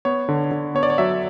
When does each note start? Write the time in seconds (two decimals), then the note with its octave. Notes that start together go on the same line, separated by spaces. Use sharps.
0.05 B3 C#5
0.29 D3
0.51 D3
0.75 B3 C#5
0.83 D5
0.90 C#5
0.98 F#3 E5